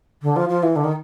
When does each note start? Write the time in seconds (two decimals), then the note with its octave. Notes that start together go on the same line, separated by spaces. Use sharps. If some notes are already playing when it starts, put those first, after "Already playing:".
0.22 D3
0.36 F3
0.49 F3
0.63 E3
0.76 D3
0.84 D#3